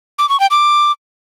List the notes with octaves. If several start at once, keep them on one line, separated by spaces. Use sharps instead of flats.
D6
C#6
G5
D6